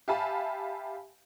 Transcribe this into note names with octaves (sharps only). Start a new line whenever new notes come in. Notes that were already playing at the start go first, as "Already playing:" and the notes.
G4 E5 F5 G#5 A5 B5